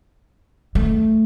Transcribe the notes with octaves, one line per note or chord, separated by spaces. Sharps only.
A3